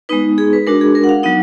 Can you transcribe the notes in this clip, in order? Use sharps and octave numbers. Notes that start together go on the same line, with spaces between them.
G#3 B3 D#4 B4
G#4
B4
G#3 D4 F#4 A#4
G#4
A#4
F#5
F5
F#3 B3 D#4 F#5